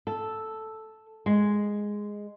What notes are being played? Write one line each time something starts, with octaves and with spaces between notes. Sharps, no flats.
A4
G#3